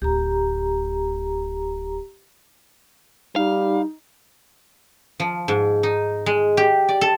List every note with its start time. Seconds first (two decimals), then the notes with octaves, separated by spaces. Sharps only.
0.02 D1 D2 G4 A#5
3.36 G3 D#4 F5
5.20 F3
5.48 G#2
5.83 D#4
6.26 G#3
6.57 G4
6.88 D5
7.01 A4